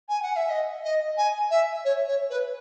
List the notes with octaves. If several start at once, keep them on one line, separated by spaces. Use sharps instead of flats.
G#5
F#5
E5
D#5
D#5
G#5
E5
C#5
C#5
B4